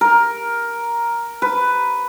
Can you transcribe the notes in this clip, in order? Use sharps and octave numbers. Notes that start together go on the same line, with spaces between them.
A#4
B4